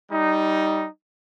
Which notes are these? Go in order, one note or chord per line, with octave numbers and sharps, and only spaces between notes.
G3 D#4